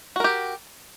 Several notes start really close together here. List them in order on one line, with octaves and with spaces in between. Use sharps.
F#4 A#4 G4